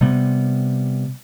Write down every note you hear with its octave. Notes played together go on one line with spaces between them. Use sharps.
C3 G3 B3